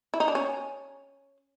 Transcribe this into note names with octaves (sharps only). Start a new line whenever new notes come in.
E4
D#4
D4
C#4